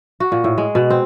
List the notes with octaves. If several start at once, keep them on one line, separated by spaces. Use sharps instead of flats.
F#4
A#2
A2
G#3
B2
C4